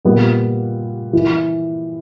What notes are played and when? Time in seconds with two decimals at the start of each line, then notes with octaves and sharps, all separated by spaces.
0.05 A#2 G3 B3
1.13 E3